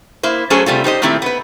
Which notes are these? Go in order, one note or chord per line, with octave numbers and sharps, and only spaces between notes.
A#3 E4 C5
F#3 A3 C#4 G#4 A4 C5
C3 G3 A3 F4
D#4 G4 C5 D#5
A#2 D#3 A3 C4 E4 G4
B3 B4